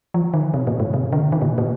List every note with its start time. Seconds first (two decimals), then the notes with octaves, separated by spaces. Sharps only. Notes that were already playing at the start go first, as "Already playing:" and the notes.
0.14 F3
0.34 D#3
0.54 C3
0.67 A#2
0.80 G#2
0.94 C3
1.13 D3
1.32 D#3
1.42 A#2
1.58 A#2